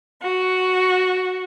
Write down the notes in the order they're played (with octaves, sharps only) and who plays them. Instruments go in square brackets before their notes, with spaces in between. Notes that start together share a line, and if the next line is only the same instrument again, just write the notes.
[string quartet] F#4